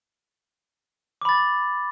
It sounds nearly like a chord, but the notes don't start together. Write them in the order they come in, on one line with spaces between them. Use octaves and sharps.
D6 B5 A6